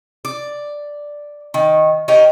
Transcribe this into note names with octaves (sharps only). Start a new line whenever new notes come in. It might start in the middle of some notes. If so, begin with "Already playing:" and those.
D5
D#3
C#4 D#4 G4 A#4